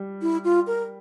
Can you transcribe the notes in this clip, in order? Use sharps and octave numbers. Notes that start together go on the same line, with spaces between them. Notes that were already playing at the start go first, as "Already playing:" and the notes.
Already playing: G3
E4
F4
A#4